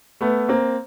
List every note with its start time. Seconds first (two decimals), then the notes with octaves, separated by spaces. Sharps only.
0.21 A3 B3
0.49 A#3 C4